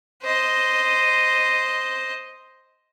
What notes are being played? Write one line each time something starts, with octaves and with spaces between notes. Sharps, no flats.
C5 D#5